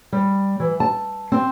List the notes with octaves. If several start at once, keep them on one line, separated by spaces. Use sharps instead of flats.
G3
E3
A5
C4